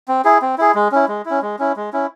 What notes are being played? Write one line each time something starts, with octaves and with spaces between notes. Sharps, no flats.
C4
E4 G#4
C4
E4 G#4
G#3
C#4 E4
G#3
C#4 E4
G#3
C#4 E4
G#3
C#4 E4